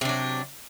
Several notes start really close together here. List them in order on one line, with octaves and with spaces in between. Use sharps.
C3 D4 F#3